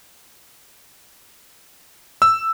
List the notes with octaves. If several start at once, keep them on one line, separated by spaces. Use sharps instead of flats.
E6